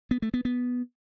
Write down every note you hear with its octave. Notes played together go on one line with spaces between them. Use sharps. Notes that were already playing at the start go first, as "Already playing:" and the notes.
B3
A3
B3
B3